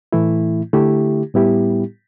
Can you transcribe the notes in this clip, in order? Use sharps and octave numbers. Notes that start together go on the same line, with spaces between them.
A2 E3 A3 E4
D3 A3 E4 G4
A2 G3 B3 E4 G4